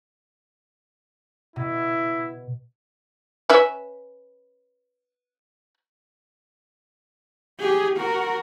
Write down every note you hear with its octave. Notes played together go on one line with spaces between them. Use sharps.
B2 E4
C#4 B4 E5
G4 G#4
F#4 A#4